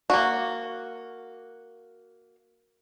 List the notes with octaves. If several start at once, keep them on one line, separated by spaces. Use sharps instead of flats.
A#3 F#4